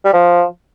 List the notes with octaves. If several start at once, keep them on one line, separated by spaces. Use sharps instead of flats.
G3
F3